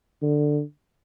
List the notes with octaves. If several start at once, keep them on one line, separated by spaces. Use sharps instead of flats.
D3